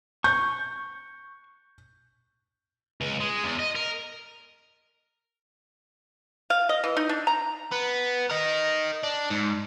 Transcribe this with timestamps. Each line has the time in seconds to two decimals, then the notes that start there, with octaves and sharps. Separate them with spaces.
0.24 C#6 G6
3.01 C#2
3.20 G#3
3.44 E2
3.59 D#5
3.75 A#4
6.50 F5
6.69 D#5
6.84 E3
6.97 D#4
7.09 D4
7.27 A#5
7.71 B3
8.30 A#4 D#5
9.03 D4
9.30 G#2